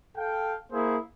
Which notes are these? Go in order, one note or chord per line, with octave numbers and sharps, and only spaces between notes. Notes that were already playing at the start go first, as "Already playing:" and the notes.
A4 F5 G5
A#3 E4 G#4 C5